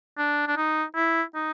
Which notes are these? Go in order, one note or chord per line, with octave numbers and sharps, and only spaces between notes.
D4
D4
D#4
E4
D#4